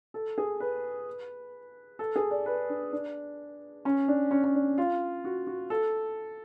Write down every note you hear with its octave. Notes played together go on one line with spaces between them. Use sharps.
A4
G#4
B4
A4
G#4
D5
B4
D4
D4
C#4
D4
C#4
C#4
D4
F4
F#4
F#4
A4